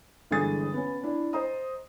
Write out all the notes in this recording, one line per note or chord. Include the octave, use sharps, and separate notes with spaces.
G1 D3 E3 G#3 D#6 A6
B3 C#4
D4 E4
C5 D#5 A#5 D#6